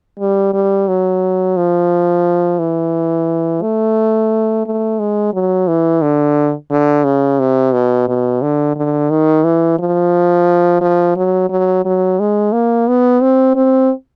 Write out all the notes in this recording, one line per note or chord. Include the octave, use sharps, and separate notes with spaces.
G3
G3
F#3
F3
E3
A3
A3
G#3
F#3
E3
D3
D3
C#3
C3
B2
B2
D3
D3
D#3
E3
F3
F3
F#3
F#3
F#3
G#3
A#3
B3
C4
C4